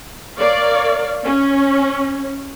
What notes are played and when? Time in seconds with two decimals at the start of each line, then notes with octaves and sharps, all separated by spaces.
0.39 A#4 C#5 D5 F5
1.25 C#4